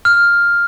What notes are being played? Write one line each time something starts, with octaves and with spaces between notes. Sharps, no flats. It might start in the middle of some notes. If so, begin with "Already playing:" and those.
F6